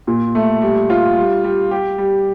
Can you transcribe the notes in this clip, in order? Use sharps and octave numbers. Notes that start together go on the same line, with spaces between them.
A#2
A3
G3
F4
G3
G3
G4
G3